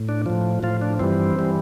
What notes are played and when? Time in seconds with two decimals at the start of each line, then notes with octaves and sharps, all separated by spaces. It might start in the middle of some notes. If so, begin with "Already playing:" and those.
Already playing: A2
0.09 D4
0.26 A2 F3
0.63 A2 F3 F4
0.82 D4
0.99 G2 E3 G3 C4
1.39 E3 G3